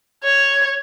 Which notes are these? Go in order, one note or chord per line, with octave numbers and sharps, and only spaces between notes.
C#5